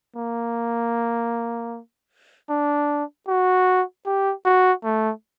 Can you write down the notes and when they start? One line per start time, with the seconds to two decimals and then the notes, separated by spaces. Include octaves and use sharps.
0.16 A#3
2.50 D4
3.28 F#4
4.06 G4
4.45 F#4
4.84 A3